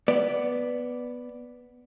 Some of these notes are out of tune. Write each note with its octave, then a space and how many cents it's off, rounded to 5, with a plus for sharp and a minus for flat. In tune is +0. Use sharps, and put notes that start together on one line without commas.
B3 +0 D5 +0